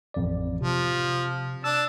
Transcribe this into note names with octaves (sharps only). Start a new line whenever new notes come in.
A1 F2 D5
C3 F3
D4 A5 E6